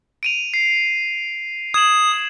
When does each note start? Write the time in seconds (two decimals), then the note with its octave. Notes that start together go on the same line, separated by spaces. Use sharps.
0.23 D7 D#7 F7
0.54 C7
1.74 D#6 G#6 E7 F#7